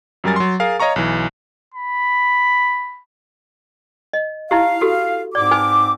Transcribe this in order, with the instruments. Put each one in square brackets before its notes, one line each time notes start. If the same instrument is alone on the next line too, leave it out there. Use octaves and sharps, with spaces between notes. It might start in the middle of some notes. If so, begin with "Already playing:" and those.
[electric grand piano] F#2 F#3 G3 A#4 G#5 A6
F#3 C6
G#4 A#4 F5
C#5 D#5 F5 A#5 C#6
B1 E3
[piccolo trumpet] B5
[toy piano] D#5
[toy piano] D#4 E4 G4 [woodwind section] F5
[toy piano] F#4 G4 A4
[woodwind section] G#2 C4 D6 [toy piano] D5
[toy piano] D#4 B4 G#5